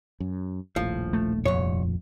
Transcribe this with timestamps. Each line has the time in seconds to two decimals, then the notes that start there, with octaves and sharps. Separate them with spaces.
0.20 F#2
0.76 D#1 A#1 A2 F3
1.13 A3
1.45 C2 F2 C#5